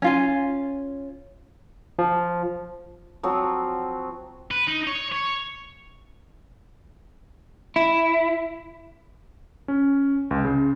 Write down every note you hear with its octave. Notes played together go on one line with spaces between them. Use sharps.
C#4 F4 G#5
F3
F3 F#3 C4
B4
D#4
C#5
C#5
E4
C#4
C#2
C#3